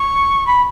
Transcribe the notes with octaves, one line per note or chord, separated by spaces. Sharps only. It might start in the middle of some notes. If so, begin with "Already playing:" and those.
Already playing: C#6
B5